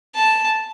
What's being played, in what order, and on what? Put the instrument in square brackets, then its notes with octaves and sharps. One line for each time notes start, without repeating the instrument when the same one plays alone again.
[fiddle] A5